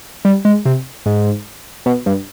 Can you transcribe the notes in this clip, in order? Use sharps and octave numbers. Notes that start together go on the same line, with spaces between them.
G3
G#3
C3
G#2
B2
G2